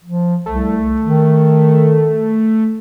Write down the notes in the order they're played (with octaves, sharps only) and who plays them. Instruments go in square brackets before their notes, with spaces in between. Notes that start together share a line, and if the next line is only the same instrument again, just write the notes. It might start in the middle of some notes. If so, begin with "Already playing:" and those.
[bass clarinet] F3
[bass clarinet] C2 [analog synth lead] A3
[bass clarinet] D#3